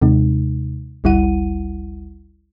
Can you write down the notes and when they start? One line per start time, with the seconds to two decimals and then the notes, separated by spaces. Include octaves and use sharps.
0.02 D#2 C3 G#3 D#4
1.04 G#1 D2 G3 E4 F#5 D#7